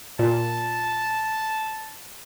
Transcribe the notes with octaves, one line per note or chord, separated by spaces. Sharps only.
A#2 A5